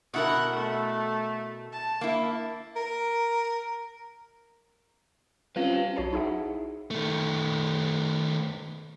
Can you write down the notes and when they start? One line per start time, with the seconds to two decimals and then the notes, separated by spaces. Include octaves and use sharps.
0.14 B2 E4 A#4 F#5
0.52 A3
1.72 A5
2.01 A#3 E4
2.76 A#4
5.56 G3 C4 C#4 F4 B4 F5
5.96 B1 F#4 C#5 A5 C7
6.13 D#4 E4 G#4 E5 F#5
6.91 D#3 A3